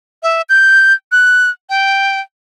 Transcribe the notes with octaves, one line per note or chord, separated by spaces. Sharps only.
E5
G6
F#6
G5